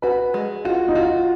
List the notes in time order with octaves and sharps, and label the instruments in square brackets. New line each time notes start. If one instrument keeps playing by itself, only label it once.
[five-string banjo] F#4 [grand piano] B4
[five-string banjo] G#3
[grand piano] F4 [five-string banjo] F#4
[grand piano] D#4
[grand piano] F4 [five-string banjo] F#4